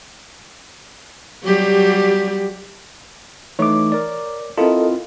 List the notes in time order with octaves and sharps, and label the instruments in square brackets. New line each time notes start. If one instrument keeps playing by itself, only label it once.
[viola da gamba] F#3 G3 G4
[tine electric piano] E3 A3 D#4 [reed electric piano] C#5 D6
[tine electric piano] A#4 D5
[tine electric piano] C4 E4 F4 [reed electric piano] A4 A#4 D#5